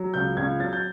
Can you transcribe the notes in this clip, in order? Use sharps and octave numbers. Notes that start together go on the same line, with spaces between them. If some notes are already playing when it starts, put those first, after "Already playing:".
Already playing: F#3
C#2 G6
C#2 G#6
F#3 A6
G6